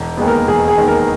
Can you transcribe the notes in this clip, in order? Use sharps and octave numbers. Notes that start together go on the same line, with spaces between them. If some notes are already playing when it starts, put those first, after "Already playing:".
Already playing: E1
D#2 D#3 G#3 B3
A#4
E1 G#4
G#4
D#2 D#3 G#3 B3
A#4